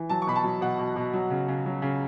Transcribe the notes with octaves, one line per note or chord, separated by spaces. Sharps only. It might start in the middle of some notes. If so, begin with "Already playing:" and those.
Already playing: E3
F#3 A5
C#6
B2 B5
A5
F#3
B2 F#5
B2
B2
F#3
C#3
C#3
F#3
C#3